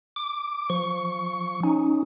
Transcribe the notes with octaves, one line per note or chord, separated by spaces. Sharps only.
D6
F3 C#6
C#4 D#4